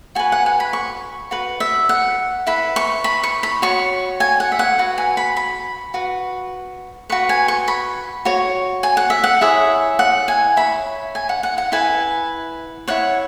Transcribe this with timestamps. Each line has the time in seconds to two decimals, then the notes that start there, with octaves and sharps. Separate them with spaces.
0.15 F#4 B4 G#5
0.32 F#5
0.46 G#5
0.60 B5
0.73 C#6
1.31 F#4 B4
1.60 E5
1.89 F#5
2.47 E4 B4 B5
2.76 C#6
3.04 B5
3.23 C#6
3.43 B5
3.62 F#4 C#5 C#6
4.20 G#5
4.40 F#5
4.52 E5
4.59 F#5
4.78 F#4 B4
4.98 G#5
5.17 B5
5.37 B5
5.94 F#4 B4
7.10 F#4 B4 C#6
7.29 G#5
7.48 C#6
7.68 B5
8.25 F#4 C#5
8.83 G#5
8.97 F#5
9.10 E5
9.24 F#5
9.41 E4 G#4 C#5 E5
9.99 F#5
10.28 G#5
10.57 E4 C#5 B5
11.15 G#5
11.29 F#5
11.43 F#5
11.58 F#5
11.72 E4 B4 G#5
12.88 E4 C#5 F#5